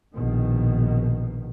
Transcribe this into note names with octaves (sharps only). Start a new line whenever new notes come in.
A#1 B2 D#3